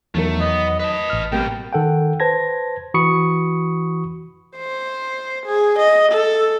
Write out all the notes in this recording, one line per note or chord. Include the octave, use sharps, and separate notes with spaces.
E2 D#3 F#3 A3 A#4
B3 D#5
B4 D#5 A5
A1 F6
B2 G3 A#3 C4 G5
D#3 A4 F#5 G5
B4 C5 A5 G#6 A#6
E3 F#4 B5 C#6 D#6 C#7
C5
G#4
D#5
A4